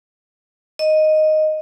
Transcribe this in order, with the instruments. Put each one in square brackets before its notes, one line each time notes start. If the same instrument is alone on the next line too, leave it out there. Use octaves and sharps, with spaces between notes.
[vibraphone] D#5